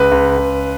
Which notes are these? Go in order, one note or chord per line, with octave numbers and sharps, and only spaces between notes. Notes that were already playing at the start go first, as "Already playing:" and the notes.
Already playing: C#2 B4
C#2
C#2